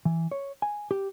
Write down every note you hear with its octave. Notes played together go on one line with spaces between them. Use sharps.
E3
C#5
G#5
G4